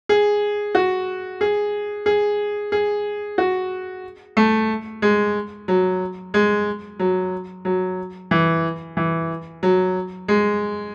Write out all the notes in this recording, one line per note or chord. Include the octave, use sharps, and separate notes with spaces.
G#4
F#4
G#4
G#4
G#4
F#4
A3
G#3
F#3
G#3
F#3
F#3
E3
E3
F#3
G#3